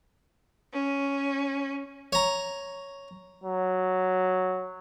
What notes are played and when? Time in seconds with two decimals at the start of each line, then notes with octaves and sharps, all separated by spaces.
0.73 C#4
2.13 C#5 A#5
3.44 F#3